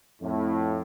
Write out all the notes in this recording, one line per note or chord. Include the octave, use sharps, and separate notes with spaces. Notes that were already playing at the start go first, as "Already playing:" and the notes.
F2 A2